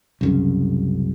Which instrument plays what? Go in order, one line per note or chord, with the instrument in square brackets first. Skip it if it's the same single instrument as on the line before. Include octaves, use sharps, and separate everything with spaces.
[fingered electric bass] C2 F#2 C#3